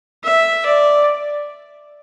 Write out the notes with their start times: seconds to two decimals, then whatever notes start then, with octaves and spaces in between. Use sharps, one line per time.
0.24 E5
0.66 D5